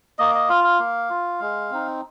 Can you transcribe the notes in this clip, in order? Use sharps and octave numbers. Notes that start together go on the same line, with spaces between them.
A#3 D#5
D#5
F4 F5
F5
A#3
F4
G#3
C4 D#4